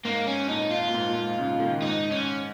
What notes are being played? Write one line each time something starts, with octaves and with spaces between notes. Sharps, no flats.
G#2 A#3
C#4
F2 A#2 D#4
F4
A#2
G#2
A#2
G#2
G#2 C#3
A#2 D#3
G#2 D#4
C#4